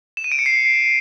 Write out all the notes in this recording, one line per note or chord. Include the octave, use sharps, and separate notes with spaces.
E7
D#7
D7
C#7
C7